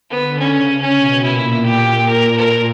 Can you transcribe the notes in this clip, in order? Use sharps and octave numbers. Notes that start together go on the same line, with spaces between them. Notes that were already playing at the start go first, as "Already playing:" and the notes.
D3 B3
C#3 C#4
C#4
B2
A#2 E4
G4
A#2 A#4
A#4